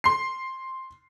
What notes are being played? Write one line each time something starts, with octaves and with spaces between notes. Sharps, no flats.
C6 C7